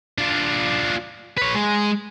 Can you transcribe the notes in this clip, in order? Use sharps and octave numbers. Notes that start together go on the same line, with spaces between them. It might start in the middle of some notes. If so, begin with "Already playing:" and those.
D4 F4
B4 C#5
G#3